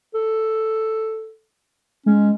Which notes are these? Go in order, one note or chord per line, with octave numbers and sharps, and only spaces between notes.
A4
G#3 C#4